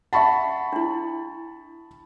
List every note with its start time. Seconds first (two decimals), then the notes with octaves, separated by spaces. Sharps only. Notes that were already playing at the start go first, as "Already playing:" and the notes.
0.13 E5 F#5 A5 B5 C#6
0.73 D4 E4